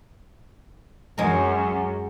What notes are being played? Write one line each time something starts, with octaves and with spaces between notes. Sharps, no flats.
F#2 G#3 A#4